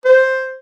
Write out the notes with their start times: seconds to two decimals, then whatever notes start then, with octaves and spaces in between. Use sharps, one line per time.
0.05 C5